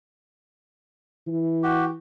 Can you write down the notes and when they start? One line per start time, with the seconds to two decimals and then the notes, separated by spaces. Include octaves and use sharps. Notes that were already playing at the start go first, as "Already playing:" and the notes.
1.27 E3
1.63 F#4 G4